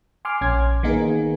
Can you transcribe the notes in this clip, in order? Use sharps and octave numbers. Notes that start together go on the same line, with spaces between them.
G#5 C6 D6 F6
A#1 C#4 G#6
D#3 A#3 B3 D#4 G#4 A#4